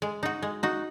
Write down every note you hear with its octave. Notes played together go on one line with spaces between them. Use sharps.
G#3
D#4 F#4
G#3
D#4 F#4